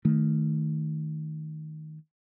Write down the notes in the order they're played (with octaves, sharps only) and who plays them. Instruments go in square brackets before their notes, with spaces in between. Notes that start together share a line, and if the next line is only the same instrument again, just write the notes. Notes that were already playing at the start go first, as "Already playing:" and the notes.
[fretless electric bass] D#3 A3